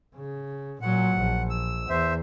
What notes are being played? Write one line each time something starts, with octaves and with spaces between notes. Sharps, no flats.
C#3
A#2 F#3 F#5
A#1
E6
E2 C5 E5